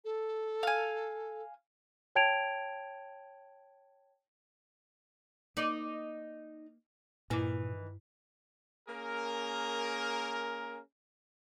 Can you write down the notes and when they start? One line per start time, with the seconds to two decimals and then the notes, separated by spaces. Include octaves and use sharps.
0.05 A4
0.63 F5 G#5
2.15 C#5 G5 A5 G#6 D7 F7
5.57 A#3 D#4 D5
7.30 G2 A#2 D#3 E3 A#3 E4
8.87 A#3 C#4 G#4 A#4